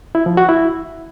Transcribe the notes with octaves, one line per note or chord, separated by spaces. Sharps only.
E4
F3
F#4
E4